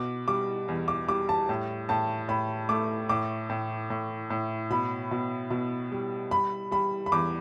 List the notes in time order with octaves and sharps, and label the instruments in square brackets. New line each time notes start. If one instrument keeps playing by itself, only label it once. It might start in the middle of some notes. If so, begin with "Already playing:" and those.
Already playing: [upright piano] B2 D6
G3 D6
E2
D6
G3 D6
A5
A2
A2 A5
A2 B5
A3 D6
A2 D6
A2
A2
A2
B2 B5
B2
B2
G3
G3 B5
G3 B5
B5
E2 D6